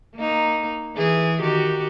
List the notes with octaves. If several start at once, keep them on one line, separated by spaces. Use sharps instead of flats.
A#3 D#4
E3 G#4
D#3 F#4 G4